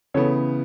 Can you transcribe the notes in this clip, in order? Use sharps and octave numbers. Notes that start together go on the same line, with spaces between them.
C#3 E3 B3 A4 C#5